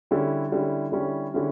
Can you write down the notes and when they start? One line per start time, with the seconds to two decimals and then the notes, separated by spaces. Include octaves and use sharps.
0.11 D3 G3 C#4 E4
0.52 D3 G3 C#4 E4
0.92 D3 G3 C#4 E4
1.34 D3 G3 C#4 E4